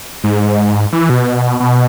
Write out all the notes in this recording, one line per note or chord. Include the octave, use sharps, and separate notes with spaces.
G#2
E3
B2
B2